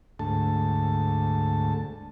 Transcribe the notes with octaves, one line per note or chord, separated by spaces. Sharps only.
D2 G#2 A3 A5